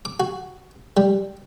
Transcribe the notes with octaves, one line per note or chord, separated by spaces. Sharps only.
D6
F#4
G3